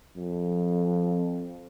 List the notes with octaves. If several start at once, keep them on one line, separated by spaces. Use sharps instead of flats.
F2